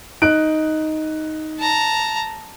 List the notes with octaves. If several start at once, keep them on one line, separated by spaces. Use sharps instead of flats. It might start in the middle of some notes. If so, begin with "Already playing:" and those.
D#4 F#6 D7
A5 A#5